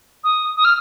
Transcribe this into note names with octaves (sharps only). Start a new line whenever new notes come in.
D#6
D#6
F6